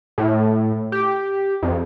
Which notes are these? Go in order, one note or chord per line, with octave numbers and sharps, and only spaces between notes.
A2
G4
F2